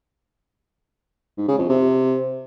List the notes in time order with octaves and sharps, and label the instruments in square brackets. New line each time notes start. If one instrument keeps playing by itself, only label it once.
[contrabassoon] G#2
C#3
F2
C3